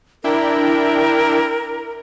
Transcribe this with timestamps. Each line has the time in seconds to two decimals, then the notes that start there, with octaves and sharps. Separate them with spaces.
0.24 D4 E4 A#4 G5